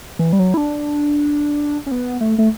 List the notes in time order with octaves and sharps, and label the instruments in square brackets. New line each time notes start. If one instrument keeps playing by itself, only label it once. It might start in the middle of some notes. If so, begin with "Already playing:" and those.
[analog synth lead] E3
G3
F#3
E4
D4
C#4
B3
A3
A3